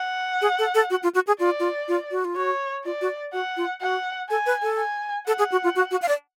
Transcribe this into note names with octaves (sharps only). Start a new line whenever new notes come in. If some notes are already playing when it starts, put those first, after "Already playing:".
Already playing: F#5
G#4
A4
A4
F#4
F4
F#4
G#4
F4 D5
F4
F4
F#4
F4
F#4 C#5
F4 D5
F#4
F#4 F#5
F4
F#4 F#5
A4 G#5
B4
A4
G#5
A4 F#5
G#4
F#4
F4
F#4
F#4
F5
D5